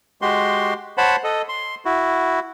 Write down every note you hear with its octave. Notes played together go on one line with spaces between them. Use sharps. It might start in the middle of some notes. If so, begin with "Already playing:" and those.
G#3 F#4 G4 C6
C5 C#5 F#5 A5 B5
A4 D#5
C6
E4 F#4